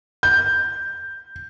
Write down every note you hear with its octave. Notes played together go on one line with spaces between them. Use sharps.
G6